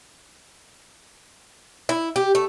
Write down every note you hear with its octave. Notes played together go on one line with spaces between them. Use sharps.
E4
G4
A3